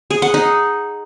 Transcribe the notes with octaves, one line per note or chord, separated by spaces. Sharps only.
G#4
F#5
D#4